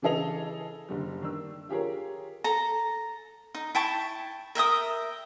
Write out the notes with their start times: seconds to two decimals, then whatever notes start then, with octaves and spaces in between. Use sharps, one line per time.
0.02 C#3 E3 G#4 A4 D#5 F7
0.88 F#1 D3 G3
1.22 D#3 D4 E6
1.69 F4 G4 G#4 A#4 C#5
2.44 A4 A#5
3.55 D#4
3.75 E4 G5 A5 C#6
4.55 A#4 E5 G5 D#6